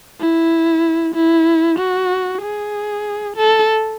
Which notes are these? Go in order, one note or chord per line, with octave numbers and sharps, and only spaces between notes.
E4
E4
F#4
G#4
A4